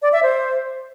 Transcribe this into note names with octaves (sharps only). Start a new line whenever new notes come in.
D5
E5
C5